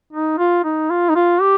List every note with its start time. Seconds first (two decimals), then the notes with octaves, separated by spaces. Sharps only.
0.13 D#4
0.38 F4
0.64 D#4
0.90 F4
1.09 D#4
1.16 F4
1.41 G4